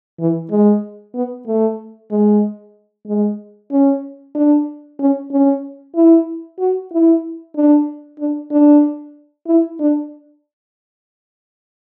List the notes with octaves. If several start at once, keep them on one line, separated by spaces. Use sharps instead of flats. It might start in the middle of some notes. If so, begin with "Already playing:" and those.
E3
G#3
B3
A3
G#3
G#3
C#4
D4
C#4
C#4
E4
F#4
E4
D4
D4
D4
E4
D4